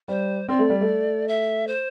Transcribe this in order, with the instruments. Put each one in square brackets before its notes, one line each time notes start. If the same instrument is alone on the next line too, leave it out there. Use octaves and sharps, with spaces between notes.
[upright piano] G3 [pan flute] C5
[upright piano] C4 [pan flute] D5
[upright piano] A3
G3
A3
[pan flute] E5
C5